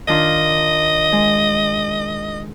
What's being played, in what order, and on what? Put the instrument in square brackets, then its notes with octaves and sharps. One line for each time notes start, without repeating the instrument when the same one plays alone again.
[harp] D#3 D4 F4 [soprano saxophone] D#5
[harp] G#3